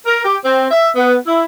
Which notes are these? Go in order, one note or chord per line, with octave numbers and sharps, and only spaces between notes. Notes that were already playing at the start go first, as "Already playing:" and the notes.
A#4
G4
C4
E5
B3
E4